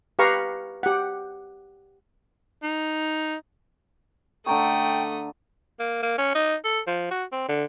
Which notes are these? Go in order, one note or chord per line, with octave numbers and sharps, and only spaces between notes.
G4 B4 F5 A#5 C#6
G4 F#5
D#4
D3 A3 G5 A#5 C#6 D#6
A#3
A#3
C#4
D#4
A4
F3
F#4
C4
D3